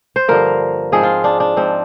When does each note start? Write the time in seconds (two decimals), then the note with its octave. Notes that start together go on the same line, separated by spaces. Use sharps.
0.16 C5
0.28 G2 D3 F3 A#3 A#4
0.92 G#2 F3 C4 G#4
1.03 F4
1.24 D4
1.40 D4
1.56 G#2 F3 C4